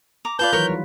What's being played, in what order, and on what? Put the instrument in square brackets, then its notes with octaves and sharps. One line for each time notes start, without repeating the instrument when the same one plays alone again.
[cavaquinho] A#5 D6
[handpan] F4 B4 [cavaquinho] D5 F5 A5 [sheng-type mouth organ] G6
[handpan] D#3 E3 F#3 [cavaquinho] A#4 C#5
[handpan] G3